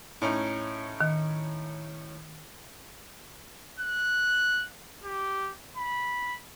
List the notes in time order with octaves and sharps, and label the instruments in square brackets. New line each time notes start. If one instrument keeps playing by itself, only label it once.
[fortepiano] A2 C#4 D#4
[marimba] D#3
[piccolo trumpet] F#6
G4
B5